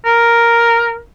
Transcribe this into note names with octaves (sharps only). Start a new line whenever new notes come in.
A#4